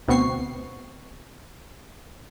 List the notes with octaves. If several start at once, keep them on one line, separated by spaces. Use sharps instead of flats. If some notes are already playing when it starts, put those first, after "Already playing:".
D2 B2 B3 C4 C#6 C7